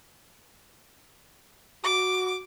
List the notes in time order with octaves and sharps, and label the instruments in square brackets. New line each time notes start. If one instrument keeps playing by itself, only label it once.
[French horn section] F#4 [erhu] D6